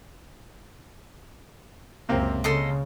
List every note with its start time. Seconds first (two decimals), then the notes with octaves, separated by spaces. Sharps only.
2.09 C#2 F#2 C3 A#3 C4
2.44 C#3 A4 D#5 C6